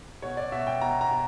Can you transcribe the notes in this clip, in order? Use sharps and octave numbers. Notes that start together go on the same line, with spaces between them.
B2 C#5
D5
B2 E5
G5
B2 A#5
A#5
B2